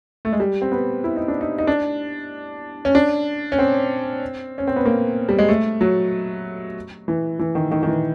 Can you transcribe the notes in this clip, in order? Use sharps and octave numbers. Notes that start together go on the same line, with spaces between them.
A3
G#3
G3
C4
B3
E4
D#4
D4
D#4
D#4
D4
C#4
D4
C#4
C4
C#4
C4
B3
A#3
G3
G#3
A3
F#3
E3
E3
D#3
D#3
D#3
E3